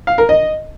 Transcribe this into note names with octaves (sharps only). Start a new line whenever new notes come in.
F5
A#4
D#5